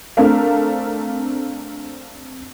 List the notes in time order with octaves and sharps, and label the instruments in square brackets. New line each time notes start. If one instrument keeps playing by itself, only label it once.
[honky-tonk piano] A3 C4 D4 A#4 F5